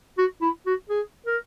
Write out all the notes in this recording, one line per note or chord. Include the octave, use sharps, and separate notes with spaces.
F#4
E4
F#4
G#4
A#4